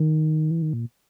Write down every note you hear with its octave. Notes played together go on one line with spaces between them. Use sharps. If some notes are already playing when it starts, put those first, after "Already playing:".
Already playing: D#3
E3
D#3
A#2